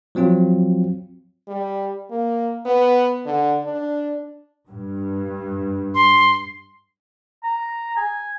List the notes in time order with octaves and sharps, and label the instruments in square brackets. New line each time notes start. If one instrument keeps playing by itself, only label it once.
[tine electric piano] F3 F#3 C4 F4
[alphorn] G3
A#3
B3
D3
D4
[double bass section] G2
[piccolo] C6
[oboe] A#5
G#5